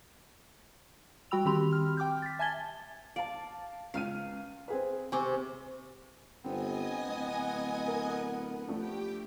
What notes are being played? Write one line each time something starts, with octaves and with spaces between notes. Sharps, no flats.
G3 F#4 G5 B5 E6 F7
D#3 C4 G4 B5 C6 F7
F6
G5 D6 F6 G6
A6 B6
E5 G#5 A5 G#6 A6 G7
D5 F5 A5
C#2 F5 F6 D#7
C4 G#4 B4
C3 C4 G#5 C#6 D6
G1 B3 C4 D#5 G#5 D#6
D1
A#4
F3 A3 D4 G4 G5